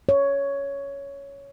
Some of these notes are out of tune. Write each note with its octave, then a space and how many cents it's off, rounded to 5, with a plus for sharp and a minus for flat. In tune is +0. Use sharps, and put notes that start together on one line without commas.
C#5 +5